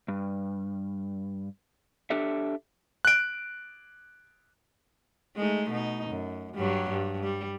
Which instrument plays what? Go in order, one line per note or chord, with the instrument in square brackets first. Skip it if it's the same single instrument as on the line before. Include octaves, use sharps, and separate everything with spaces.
[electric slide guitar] G2
D4 G4 A4 E5
[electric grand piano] F#6 D7
[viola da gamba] G#3 A3 D#4
B2 D#4
F#2
G2 F#3 G3
G2
G3